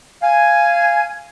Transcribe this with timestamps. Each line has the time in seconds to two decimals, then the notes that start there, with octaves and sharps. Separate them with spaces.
0.23 F5 G#5